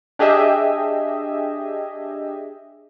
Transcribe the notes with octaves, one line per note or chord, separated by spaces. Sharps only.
D4 G4 G#4 D#5 E5